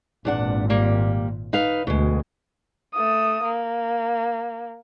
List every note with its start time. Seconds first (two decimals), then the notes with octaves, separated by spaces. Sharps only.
0.25 G#1 E2 A#2 D4 F#5
0.70 G3 A#3
1.53 D#4 B4 F5
1.87 D2 B2 G#3
2.93 A3 D#6
3.43 A#3